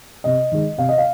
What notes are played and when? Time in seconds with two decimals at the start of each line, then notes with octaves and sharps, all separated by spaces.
0.24 C3 D#5
0.51 D#3 G#3
0.78 C3 F5
0.89 D#5
0.98 F5